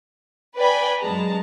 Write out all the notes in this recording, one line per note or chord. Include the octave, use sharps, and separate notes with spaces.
B4 D5 G5 G#5 B5
F#2 F#3 G#3 A5 A#5